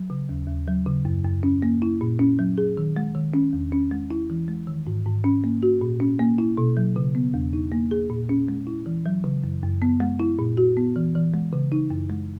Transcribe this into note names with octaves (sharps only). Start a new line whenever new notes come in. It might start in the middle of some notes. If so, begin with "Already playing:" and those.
Already playing: F#3
C#3
D#2
D#2
F#3
C#3
F#2
F#2
C#4
A#3
E4
A#2
C#4
F#3
G#4
D#3
G#3
D#3
C#4
E2
C#4
G#3
E4
E3
G#3
D#3
G#2
G#2
C#4
A#3
F#4
A#2
C#4
A#3
E4
B2
F#3
C#3
B3
E2
D#4
A#3
G#4
A#2
C#4
G#3
E4
E3
F#3
C#3
F#2
F#2
B3
G#3
E4
A#2
F#4
B3
E3
E3
G#3
C#3
D#4
F#2
G#3